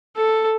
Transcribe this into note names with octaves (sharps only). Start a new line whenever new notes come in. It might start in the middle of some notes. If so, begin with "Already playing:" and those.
A4